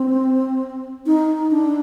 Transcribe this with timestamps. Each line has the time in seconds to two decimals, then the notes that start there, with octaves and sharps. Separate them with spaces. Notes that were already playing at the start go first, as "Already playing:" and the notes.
Already playing: C4
1.06 D#4
1.51 D4